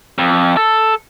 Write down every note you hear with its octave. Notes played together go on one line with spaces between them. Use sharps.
F2
A4